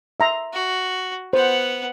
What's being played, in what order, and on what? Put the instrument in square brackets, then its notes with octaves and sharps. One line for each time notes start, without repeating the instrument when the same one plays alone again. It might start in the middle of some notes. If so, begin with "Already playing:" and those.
[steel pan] E5 A#5 C6
[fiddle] F#4
[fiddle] B3 F#5 [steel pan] C5